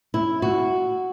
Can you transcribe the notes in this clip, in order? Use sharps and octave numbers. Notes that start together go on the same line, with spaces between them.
E4
F#4